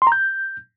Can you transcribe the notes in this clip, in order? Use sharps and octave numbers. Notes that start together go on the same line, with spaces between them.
C6
A#5
G6